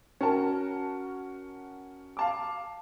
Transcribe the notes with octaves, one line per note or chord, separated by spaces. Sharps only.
C#4 F#4 A#4 A5
F5 A5 D6